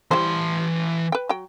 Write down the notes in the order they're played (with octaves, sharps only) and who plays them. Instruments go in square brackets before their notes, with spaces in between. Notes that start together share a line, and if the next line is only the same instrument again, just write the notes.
[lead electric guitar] E3 C6 [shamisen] G3 E4 C5
[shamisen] B4 G5
F#3 G5